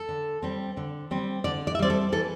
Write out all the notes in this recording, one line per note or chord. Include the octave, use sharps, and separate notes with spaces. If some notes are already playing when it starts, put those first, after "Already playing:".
Already playing: A4
D3
G3 C4
D3
G3 C4
D3 D5
D5
E5
G3 C4 D5
A4
E3 A4